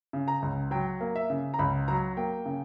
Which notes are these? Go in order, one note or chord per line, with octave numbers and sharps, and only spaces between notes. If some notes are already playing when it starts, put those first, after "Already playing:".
C#3
A#5
C#2
F#3 G5
A#3
E5
C#3
A#5
C#2 B5
F#3 A#5
A#3 G5
C#3